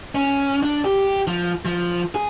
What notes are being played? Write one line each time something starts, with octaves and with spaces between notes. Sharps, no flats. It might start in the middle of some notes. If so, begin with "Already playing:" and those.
C#4
D4
G4
F3
F3
G#4